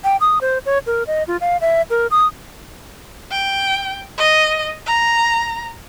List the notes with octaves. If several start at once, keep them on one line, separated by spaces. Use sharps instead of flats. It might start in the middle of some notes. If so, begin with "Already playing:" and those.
G5
D#6
C5
C#5
A#4
D#5
F4
F5
E5
A#4
D#6
G5
D#5
A#5